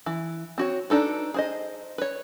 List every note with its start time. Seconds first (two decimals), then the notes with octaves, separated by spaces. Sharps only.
0.06 E3
0.58 C4 F#4 C#5
0.90 D4 D#4 A4 B4
1.34 G#4 C5 D#5
1.98 B4 C#5